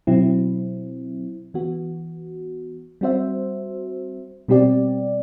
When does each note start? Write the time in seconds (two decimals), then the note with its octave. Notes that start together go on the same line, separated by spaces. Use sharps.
0.07 B2 F#3 C4 E4
1.54 E3 B3 F#4
3.01 G3 C4 F#4 C5 E5
4.48 B2 G3 C4 G4 D5